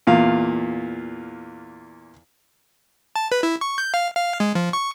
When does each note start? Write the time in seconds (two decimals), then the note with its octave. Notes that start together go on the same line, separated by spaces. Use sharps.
0.07 E2 A#2 F5
3.16 A5
3.32 B4
3.43 E4
3.61 C#6
3.78 G6
3.94 F5
4.15 F5
4.40 G#3
4.55 F3
4.73 C#6